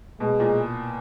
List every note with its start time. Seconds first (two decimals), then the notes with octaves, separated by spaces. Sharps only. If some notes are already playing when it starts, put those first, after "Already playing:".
0.20 B2 G#3
0.40 A#2